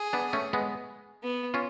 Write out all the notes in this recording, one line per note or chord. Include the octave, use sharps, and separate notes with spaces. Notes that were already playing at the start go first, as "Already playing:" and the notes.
Already playing: G#4
B3 D4
A3 C#4
G#3 B3
B3
C#4 F4